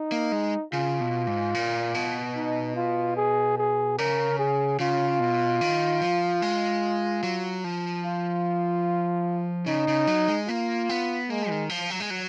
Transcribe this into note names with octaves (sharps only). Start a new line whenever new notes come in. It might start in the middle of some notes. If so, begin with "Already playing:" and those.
Already playing: D#4
A#3
G#3
C#3 F4
B2
G#2
A#2
B2
D#4
F4
G#4
G#4
C#3 A#4
G#4
C#3 F4
B2
D#3
F3
G#3
F#3
F3
F4
C#3 D#4
C#3
F#3
G#3
A#3 F4
B3
G#3 A#3
D#3
F3
F#3
G#3
F#3